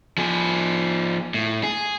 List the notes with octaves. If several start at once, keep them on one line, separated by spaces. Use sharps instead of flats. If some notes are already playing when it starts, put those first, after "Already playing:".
F3 G#4
A2
G#4